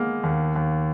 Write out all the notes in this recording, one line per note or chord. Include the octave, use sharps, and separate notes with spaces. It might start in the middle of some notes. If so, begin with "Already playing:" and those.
Already playing: G#3 A#3 B3
D#2
D#2